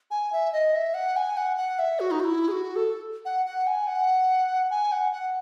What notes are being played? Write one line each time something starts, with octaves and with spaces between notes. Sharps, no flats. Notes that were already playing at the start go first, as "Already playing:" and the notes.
G#5
E5
D#5
E5
F#5
G#5
F#5
F#5
E5
F#4
D#4
F#4
E4
G#4
F#4
A4
F#5
F#5
G#5
F#5
G#5
F#5
F#5